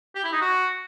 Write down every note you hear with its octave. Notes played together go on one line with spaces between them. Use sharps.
G4
E4
D#4
F#4